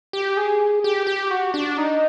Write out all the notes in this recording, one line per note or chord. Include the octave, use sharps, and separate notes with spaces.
G4
G#4
G4
G4
F#4
D4
D#4